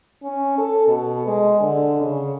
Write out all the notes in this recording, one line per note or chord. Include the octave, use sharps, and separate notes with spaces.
C#4
A4
B2
G#3
D3
C#3